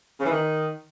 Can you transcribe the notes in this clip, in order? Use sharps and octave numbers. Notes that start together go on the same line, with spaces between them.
C#3
E3
D#3